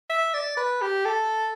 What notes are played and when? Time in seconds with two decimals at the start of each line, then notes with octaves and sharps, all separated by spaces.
0.10 E5
0.34 D5
0.57 B4
0.81 G4
1.05 A4